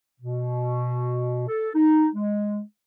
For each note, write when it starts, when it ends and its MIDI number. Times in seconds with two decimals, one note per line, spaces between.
0.20 1.44 47
1.47 1.70 69
1.74 2.07 63
2.15 2.60 56